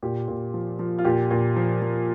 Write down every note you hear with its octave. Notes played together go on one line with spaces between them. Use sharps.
A#2 G4
A#2
F3
F3
F4
A#2 G4
A#2
F3
F3